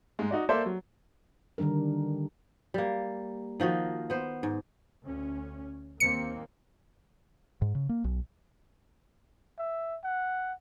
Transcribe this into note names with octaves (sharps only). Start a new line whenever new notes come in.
G#2 G#3
D#4 F#4 D5
A#3 A4 C5 D5 E5
F#3
D3 D#3 G3 D4 A#4
G3 A#3
D#3 F3 F#4 D#5
B3 C5
G#2
D2 C#4
D#2 A#3 C4 C#7
G#2
C#3
A#3
B1
E5
F#5